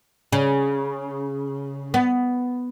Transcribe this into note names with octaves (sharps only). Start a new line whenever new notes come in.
C#3
B3